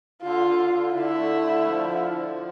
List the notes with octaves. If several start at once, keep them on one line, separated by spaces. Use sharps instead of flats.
D3 F4
D3
D3
D3 E4
A3
D3
F3
D3
F3